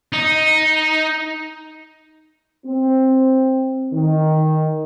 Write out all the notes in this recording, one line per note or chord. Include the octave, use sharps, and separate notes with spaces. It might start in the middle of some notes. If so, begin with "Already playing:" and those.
D#4
C4
D#3